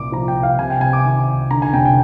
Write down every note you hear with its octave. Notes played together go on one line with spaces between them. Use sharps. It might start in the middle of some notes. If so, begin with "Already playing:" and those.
Already playing: C2 A#2 D6
F3 A#5
G5
C2
F5
C3 G#5
G5
C3 G#5
D6
D#3
C2
D3 A#5
G#5
F1 G5
G5